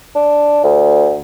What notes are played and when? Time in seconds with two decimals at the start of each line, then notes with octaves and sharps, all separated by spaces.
0.16 D4
0.64 D2